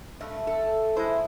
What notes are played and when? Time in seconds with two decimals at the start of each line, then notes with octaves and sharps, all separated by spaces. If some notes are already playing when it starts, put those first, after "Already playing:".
0.21 G2 A3 E5
0.47 A4
0.96 G#3 E4 C5